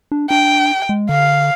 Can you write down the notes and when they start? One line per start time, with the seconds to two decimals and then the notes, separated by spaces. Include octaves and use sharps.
0.12 D4
0.30 D4 G5
0.89 G#3
1.09 D3 F5